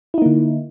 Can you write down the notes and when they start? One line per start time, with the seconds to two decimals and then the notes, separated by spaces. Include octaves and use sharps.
0.14 E4
0.18 D#4
0.22 A#3
0.26 D3